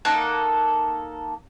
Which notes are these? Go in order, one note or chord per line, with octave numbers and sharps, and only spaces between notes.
A#3 D#4 A4 F#5